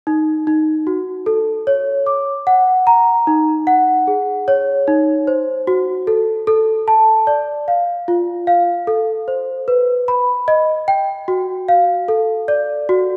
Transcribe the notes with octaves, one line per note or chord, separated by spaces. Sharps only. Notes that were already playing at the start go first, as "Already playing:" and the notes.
D#4
D#4
F#4
A4
C#5
D6
F#5
A#5
D#4
F#5
G#4
C#5
D#4
C5
F#4
A4
A4
A5
D5
F5
F4
F5
A4
C5
B4
B5
D#5
G5
F#4
F5
A4
D5
F#4